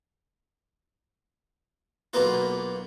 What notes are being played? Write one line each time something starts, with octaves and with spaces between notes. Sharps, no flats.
B1 B2 A#3 B3 F4